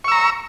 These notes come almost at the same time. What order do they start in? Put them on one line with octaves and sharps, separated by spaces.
C#6 E6 A#5